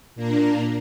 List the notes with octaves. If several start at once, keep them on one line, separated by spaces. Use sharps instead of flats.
A#2 A#3 D4 A#5